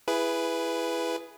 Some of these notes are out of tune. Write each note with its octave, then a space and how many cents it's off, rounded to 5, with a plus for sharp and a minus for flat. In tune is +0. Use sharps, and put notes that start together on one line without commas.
E4 +20 G#4 +0 B4 +0